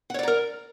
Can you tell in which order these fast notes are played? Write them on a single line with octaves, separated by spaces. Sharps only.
F#5 C#5 D5 A#5 A#4